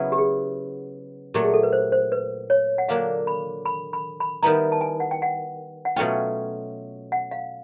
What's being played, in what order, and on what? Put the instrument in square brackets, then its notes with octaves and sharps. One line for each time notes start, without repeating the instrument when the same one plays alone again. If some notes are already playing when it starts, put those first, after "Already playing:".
Already playing: [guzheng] C#3 F#3 B3 E4
[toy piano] G4
G#4
[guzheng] A#2 F#3 A3 [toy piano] G4
[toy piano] G#4
A4
B4
C5
C5
B4
C#5
F#5
[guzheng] D3 F#3 A#3 D4 F4 [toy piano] F5
[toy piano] B5
B5
B5
B5
[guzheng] D#3 G3 B3 E4 [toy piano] A#5
[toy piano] A5
G#5
F#5
G5
F#5
F#5
[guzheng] B2 F#3 A3 C#4 F4 [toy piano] G5
[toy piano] F#5
F5